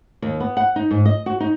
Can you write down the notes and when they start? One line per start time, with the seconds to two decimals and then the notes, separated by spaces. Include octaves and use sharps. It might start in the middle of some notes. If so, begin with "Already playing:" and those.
0.22 D#2
0.40 B3
0.57 F#5
0.76 D#4
0.91 G#2
1.05 D#5
1.26 F#4
1.40 D#4